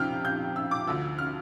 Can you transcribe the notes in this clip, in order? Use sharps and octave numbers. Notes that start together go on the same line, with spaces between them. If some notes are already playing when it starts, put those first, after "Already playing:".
Already playing: F2 C3 F3 G5 F6
G6
E6
D6
D2 D3 F3 E6
F6